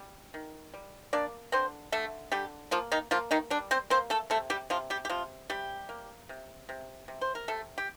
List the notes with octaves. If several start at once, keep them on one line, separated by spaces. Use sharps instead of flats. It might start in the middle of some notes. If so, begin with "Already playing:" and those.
Already playing: G3
D#3
G3
A#3 D4 D5
D3 C4 C5
D3 A3 A4
D3 G3 G4
F3 A#3 F4
D#3 D#4
F3 A#3 F4
D#3 D#4
G3 D4
C4 C5
A#3 C4 C5
A3 A4
C3 A3 A4
G3 G4
C3 F3 F4
G3 G4
G4
C3 F3 F4
C3 G3 G4
A#3
C3
C3
C3
C5
A#4
C3 A3 A4
G4